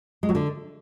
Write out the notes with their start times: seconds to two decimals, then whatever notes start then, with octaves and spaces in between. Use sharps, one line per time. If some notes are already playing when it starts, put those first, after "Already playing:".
0.23 G#3
0.29 F#3
0.35 D3